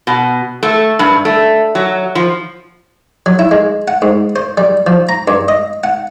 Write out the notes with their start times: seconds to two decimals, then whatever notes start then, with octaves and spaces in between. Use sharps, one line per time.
0.07 B2
0.63 A3
0.99 G2
1.25 A3
1.75 F#3
2.15 F3
3.26 F#3
3.39 E4
3.51 G#3
3.88 F#5
4.02 G#2
4.36 C5
4.58 G3
4.87 F3
5.09 A#5
5.28 G2
5.48 D#5
5.84 F#5